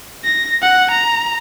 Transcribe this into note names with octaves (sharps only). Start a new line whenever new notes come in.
A#6
F#5
A#5